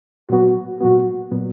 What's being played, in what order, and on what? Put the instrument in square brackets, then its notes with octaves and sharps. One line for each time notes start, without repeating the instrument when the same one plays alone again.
[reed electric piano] A#2 F#3 B3 [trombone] F#4
[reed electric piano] A#2 F#3 B3 [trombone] F#4
[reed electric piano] A#2 F#3 B3